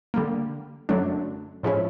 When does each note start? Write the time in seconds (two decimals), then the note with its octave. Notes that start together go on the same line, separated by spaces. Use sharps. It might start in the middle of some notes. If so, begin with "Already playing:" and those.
0.14 D3 G3 A#3
0.89 F#2 D3 F#3 A3 D4
1.63 A2 F3 G#3 C#4 E4